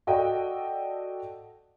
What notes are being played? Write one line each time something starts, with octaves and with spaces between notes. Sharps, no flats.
F#4 A4 D5 D#5 G5